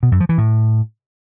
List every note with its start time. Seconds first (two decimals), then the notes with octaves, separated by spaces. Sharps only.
0.03 B2
0.12 F#2
0.20 F3
0.29 E3
0.38 A2